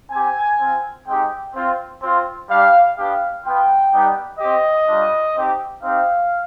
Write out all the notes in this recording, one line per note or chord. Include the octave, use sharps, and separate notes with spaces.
C4 G4 G#5
C4 F4
G#3 C4 D#4 G4 G5
C4 F4
C4 F4
G3 D4 G4 F5
B3 D4 G4 F5
B3 F4 G5
G3 B3 D#4 G4
C4 G4 D#5
G3 D4 F4
C4 D#4 G4
C4 D#4 G4 F5